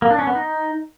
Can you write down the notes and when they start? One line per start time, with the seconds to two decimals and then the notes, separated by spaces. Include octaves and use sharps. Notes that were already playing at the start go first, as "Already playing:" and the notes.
0.02 A#3
0.10 D4
0.19 C#4
0.27 B3
0.35 D#4